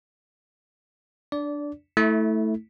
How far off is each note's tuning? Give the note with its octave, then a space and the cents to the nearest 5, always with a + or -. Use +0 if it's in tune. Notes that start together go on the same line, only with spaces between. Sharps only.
D4 +0 D5 -20
A3 +0 E4 -20